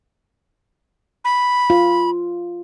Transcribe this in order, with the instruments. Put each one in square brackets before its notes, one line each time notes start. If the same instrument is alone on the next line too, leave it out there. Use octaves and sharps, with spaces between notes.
[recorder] B5
[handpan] F4